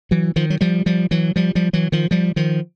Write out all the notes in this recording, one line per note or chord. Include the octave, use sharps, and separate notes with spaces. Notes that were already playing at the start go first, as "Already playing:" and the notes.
E3 F#3
D#3 F3
F#3
F3 G3
F3 G3
E3 F#3
F3 G3
F3 G3
E3 F#3
D#3 F3
F3 G3
D#3 F3